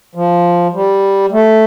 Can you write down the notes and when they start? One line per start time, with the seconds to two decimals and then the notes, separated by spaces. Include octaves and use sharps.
0.15 F3
0.74 G3
1.32 A3